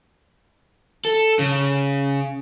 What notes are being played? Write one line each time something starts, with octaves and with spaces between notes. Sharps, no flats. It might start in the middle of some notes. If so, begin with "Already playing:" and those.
A4
C#3